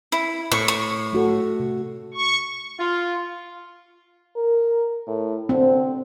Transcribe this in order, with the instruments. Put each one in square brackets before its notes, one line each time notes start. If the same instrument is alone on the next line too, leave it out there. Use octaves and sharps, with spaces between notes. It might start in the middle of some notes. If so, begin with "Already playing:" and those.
[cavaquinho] E4
[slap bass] A2 [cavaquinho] C#6
[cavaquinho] C#6
[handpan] A3 F#4 A4
C3
[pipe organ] C#6
[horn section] F4
[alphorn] A#4
A2
[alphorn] D3 [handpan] C4